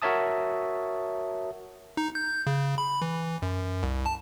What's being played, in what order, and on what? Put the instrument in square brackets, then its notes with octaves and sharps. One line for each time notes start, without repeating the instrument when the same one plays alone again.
[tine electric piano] F#4 A#4 C#5 E5 A5 D#6
[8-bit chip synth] D#4
G6
C#3
B5
E3
F#2
C2
A5